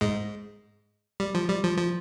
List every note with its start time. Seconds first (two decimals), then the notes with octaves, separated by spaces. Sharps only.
0.01 G#2 G#3
1.20 G3
1.35 F3
1.48 G3
1.64 F3
1.78 F3